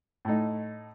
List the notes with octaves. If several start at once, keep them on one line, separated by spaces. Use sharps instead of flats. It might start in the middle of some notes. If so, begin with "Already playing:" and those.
A2 A3 D#4